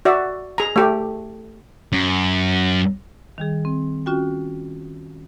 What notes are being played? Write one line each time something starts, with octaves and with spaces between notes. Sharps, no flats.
F#4 D5 E5
G#4 A#5
A3 G4
F#2
D#3 G3 G#4
C4
C#4 F4 F#4 G5